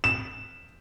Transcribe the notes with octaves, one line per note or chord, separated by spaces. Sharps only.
E7